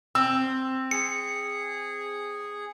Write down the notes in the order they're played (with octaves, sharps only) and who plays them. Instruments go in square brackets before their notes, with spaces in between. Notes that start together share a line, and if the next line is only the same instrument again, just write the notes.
[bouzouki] C4 [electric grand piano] E6
[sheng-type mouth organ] G#4 [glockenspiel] C#7